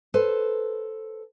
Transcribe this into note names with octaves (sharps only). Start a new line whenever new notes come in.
A4 B4 C5